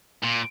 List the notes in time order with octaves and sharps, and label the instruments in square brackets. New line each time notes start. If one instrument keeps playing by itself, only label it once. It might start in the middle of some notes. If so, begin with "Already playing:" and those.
[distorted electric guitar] A#2